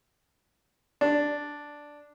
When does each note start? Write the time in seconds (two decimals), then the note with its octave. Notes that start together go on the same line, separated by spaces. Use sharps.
1.01 D4